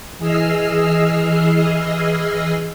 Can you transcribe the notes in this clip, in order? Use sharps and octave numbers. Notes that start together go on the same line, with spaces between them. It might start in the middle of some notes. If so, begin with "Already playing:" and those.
E3 G#4 D#5 E6 F6 C7